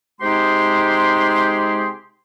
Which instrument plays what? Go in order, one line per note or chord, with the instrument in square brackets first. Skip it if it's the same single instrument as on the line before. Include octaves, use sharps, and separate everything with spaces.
[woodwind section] C3 G#3 D#4 G4 G#4 C6